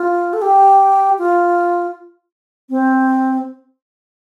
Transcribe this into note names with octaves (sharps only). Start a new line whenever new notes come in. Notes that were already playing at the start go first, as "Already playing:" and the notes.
Already playing: F4
A4
G4
F4
C4